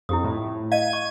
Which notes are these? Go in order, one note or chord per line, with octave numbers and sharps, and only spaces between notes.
F2 E4 G4 D#6
A2
D#5 F5 G#6 D#7
C#6